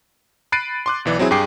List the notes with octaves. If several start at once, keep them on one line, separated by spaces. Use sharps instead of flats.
B5 F#6 A6 C7 D7 D#7
C6 D6 F#6
B1 E3 D5
F#3 C4 E4 G#4
G2 G#4 G5 D6 C7